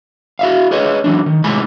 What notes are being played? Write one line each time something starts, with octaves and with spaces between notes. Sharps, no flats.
F#4 E5 F5
G#4 B4 C#5 D#5
E3 F#3 D4
D#3
A2 C3 G#3 G#5 B5